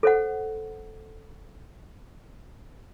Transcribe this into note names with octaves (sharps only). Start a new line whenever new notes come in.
A4 C5 F#5